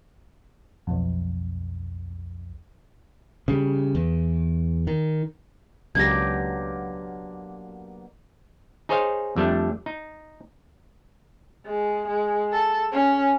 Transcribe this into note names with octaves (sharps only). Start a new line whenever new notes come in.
B1 F2
C#3 G3
E2
D#3
C#2 B2 D3 F#3 A#3 G4 G#6 A#6
D#4 G#4 C5 C#5 D#5 F5
F2 G3 A3 D4
D#4
G#3
G#3
A4
C#4